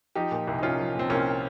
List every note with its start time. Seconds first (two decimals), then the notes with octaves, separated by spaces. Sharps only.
0.15 F3 D#4 G4
0.32 A#2
0.47 C2
0.59 D#4
0.63 C2 C#4 F4
0.79 F3
0.95 A#2 C4
1.10 C2 A#3 C#4